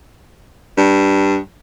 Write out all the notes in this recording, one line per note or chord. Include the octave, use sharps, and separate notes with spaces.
G2